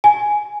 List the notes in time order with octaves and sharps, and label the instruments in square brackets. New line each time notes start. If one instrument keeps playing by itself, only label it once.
[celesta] G#5